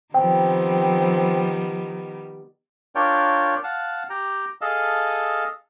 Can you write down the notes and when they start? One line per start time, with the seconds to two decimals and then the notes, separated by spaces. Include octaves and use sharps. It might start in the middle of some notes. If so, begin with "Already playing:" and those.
0.14 D#3 F3 G3 B3 C4 G5
2.95 D4 F4 A#4 C#5 D5 G5
3.64 F5 F#5 A5
4.10 G4 G5 A#5
4.61 G#4 A4 D#5 F5 A5